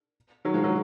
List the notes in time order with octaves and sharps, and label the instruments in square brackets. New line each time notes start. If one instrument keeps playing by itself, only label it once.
[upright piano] D#3 F#3
F3 G#3
D#3 F#3